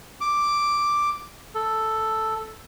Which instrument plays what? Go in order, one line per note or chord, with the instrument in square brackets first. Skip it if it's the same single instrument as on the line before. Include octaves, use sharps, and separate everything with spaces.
[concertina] D6
A4